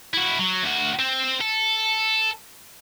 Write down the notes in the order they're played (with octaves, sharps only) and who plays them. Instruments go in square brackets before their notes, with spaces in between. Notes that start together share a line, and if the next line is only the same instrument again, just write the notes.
[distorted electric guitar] E4 F#4
F#3
D2 F#4
C4
A4